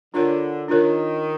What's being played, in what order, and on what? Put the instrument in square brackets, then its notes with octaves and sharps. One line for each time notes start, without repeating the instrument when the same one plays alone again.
[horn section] D3 [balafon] D4 F4 A#4 C#5
[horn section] D#3 [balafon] D4 F4 A#4 C#5